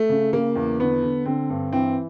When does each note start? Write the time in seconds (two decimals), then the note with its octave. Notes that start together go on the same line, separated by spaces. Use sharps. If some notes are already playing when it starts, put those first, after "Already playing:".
Already playing: A3
0.09 C#3
0.33 C#3 A#3
0.56 E2
0.80 D3 B3
1.02 D3
1.26 D3 C4
1.50 G2
1.73 E3 C4